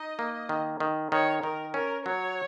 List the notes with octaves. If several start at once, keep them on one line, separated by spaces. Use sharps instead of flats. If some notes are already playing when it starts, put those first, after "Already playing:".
Already playing: D#4 D#5
A#3
D#3
D#3
D#3 C#5
D#3 A#4
C#4 A#4
F#3 C#5